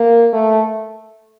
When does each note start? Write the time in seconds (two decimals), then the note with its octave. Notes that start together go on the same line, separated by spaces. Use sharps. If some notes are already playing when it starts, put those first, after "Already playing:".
Already playing: A#3
0.33 A3